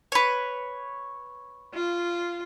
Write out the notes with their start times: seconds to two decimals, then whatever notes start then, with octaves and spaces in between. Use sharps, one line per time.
0.12 B4 C#5
1.74 F4